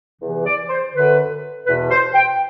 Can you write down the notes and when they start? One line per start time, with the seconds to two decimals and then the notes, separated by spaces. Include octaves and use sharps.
0.21 E2 C3 E3
0.46 D5
0.69 C5
0.94 F#2 D3 B4
1.67 E2 B2 B4
1.91 C5
2.14 G5